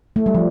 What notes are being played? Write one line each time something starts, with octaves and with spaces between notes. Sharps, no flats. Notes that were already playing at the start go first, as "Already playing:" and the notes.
A3
G3
F3